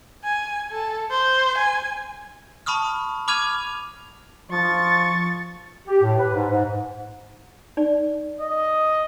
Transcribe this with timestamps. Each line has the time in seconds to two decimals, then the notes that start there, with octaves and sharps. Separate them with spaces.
0.24 G#5
0.72 A4
1.10 C5
1.58 G#5
2.66 A5 B5 C#6 D#6 F6
3.28 B5 D6 F6 G#6 D#7 F7
4.51 F3 C#6 A6
5.87 G4
6.03 A2
6.18 B4
6.34 G#2
6.50 G#2
7.77 D#4 D5
8.41 D#5